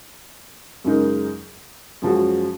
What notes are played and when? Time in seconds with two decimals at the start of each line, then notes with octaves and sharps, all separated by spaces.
0.85 F#2 C#3 G#3 D#4 A#4
2.02 F#2 F3 G#3 C#4 F#4